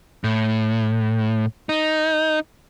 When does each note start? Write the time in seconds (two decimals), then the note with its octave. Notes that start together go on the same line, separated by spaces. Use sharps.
0.24 A2
1.69 D#4